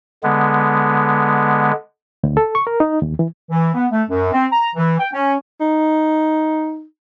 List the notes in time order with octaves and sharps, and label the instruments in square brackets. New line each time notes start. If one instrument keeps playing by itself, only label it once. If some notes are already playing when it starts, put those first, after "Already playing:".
[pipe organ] D3 G#3 B3
[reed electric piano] D2
A4
C#6
A#4
D#4
D#2
E3
[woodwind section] E3
B3
A3
F#2
C4
A#5
E3
G5
C#4
[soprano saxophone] D#4